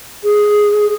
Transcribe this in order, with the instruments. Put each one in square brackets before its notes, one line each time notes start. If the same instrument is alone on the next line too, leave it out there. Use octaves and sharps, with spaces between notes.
[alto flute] G#4